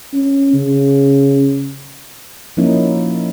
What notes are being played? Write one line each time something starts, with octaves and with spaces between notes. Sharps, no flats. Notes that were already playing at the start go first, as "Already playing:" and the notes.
C#4
C#3
F3 A#3 C#4 D#4 E4